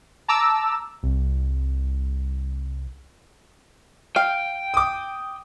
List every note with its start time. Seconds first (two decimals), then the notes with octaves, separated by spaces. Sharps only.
0.28 A5 A#5 D6 E6
1.03 C2
4.16 F5 G5
4.74 D6 D#6